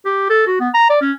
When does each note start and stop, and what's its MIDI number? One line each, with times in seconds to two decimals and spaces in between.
0.05 0.30 67
0.30 0.44 69
0.47 0.60 66
0.60 0.69 59
0.74 0.88 82
0.90 0.98 74
1.01 1.12 61